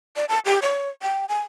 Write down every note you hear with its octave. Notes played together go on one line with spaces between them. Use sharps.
D5
A5
G4
C#5
G5
G#5